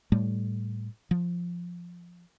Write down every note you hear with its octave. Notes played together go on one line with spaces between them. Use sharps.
A2 G3 A3
F3